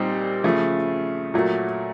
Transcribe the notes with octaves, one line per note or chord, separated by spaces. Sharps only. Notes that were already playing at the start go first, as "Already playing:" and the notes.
Already playing: A#2 G3 C4 D#4 G4
C#3 F3 A3
A#2 F#3 A3